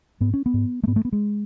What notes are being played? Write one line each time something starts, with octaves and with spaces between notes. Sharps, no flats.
G#2 B3
C#4
B3
G#2
A3
G#2 B3
A3
B3
G#3